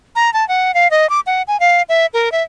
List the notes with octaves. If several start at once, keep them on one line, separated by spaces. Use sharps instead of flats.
A#5
A5
F#5
F5
D#5
D6
F#5
G#5
F5
E5
A#4
E5